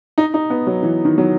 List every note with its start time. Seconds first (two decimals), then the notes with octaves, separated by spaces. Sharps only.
0.18 D#4
0.34 D#4
0.50 B3
0.67 F#3
0.83 E3
1.05 D#3
1.18 F#3